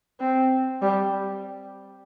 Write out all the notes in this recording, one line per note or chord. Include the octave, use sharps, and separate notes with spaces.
C4
G3